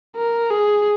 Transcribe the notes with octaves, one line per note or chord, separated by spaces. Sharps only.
A#4
G#4